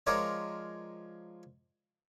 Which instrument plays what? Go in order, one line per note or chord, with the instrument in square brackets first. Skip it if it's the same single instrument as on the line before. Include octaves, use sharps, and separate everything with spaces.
[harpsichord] F3 G#3 A#4 C#5 D5